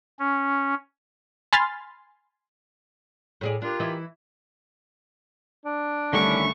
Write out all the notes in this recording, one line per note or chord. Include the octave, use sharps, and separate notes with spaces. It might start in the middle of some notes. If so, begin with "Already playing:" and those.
C#4
G#5 B5 C6 F6 A6
A2 G#4 D5
D4 F4 G4 A#4
E3 E4 D#5
D4
C2 D3 D#3 A3 C#4 E4 C#6